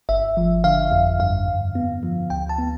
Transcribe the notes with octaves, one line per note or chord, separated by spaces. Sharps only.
G1 E5
F3
D3 F5
F2
G2 F5
G2
B3
F3
D2 G5
A5
B3